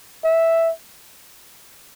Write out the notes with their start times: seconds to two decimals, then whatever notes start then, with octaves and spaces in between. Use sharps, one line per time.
0.24 E5